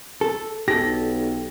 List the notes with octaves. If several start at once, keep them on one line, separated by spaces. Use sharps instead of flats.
A4
B1 G4 A4 A#6